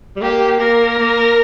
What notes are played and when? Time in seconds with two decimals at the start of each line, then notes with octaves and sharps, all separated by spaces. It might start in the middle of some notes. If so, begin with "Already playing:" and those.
0.16 G3
0.21 A#3 G4
0.60 A#3 A#4
0.99 A#3